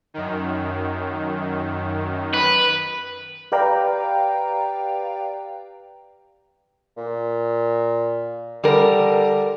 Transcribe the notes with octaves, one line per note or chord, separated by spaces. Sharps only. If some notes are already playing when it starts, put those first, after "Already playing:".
F#2 D#3
B4
G4 B4 D5 F5 G5 A#5
A#2
D3 G3 A#4